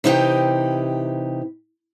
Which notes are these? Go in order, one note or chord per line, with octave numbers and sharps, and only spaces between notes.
C3 E3 D#4 E4 G4 G5